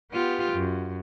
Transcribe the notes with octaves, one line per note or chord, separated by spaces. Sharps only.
B3 F4 G4
F#2